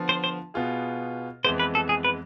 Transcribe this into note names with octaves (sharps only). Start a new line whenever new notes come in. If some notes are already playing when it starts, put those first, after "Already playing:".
Already playing: D3 F3 B3
C5
C5
B2 B3 F4 G#4
F2 E3 G#3 B3 C5
B4
A4
G#4
B4